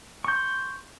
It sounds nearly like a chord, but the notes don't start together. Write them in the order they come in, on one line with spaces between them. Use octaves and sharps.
C#6 G6 C6